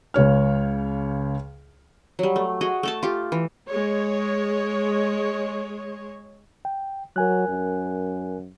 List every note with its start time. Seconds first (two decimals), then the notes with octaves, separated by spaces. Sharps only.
0.14 C#2 C#3 C#5 F6
2.19 F#3 G3
2.36 A3
2.61 F#4 G#4 D#5
2.83 A3 A4 A5
3.03 F4 G4
3.32 E3
3.69 G#3 C#5
6.65 G5
7.16 F#3 A#4 G#5 F#6
7.48 F#2